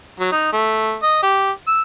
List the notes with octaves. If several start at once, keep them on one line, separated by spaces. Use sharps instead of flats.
F#3
D#4
A3
D#5
G4
E6